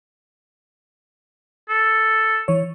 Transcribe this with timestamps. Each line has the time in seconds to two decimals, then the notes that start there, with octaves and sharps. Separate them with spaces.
1.69 A4
2.48 E3 C#5